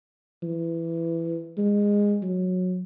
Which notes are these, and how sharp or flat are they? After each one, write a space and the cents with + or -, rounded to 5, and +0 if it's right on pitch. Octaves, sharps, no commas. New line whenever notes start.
E3 +10
G#3 -20
F#3 -15